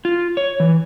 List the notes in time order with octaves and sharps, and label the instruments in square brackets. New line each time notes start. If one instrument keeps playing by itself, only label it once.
[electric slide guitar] F4
C#5
E3